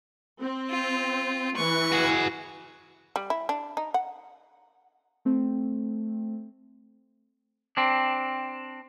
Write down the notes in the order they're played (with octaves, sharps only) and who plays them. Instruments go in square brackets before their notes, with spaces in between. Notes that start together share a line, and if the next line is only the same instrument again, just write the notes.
[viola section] C4
[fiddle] F4
[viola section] E3 B4 [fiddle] C#6
[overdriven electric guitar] F#4 G#4
[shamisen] G3
E4
D4
D#4
F#5
[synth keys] A3 C4
[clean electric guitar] C4 D4